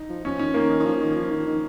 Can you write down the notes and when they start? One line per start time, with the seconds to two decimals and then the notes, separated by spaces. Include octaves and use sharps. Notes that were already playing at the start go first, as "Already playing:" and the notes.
Already playing: D#4
0.09 F3
0.24 F3 C#4
0.39 D#3 C#4
0.54 D#3 A#3
0.70 D#3
0.80 D#3
0.85 F3
0.96 F3
1.00 D#3
1.16 F3
1.31 D#3
1.46 D#3